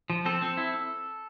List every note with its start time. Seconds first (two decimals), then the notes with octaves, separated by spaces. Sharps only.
0.10 F3
0.25 C4 A4
0.42 C4
0.57 E4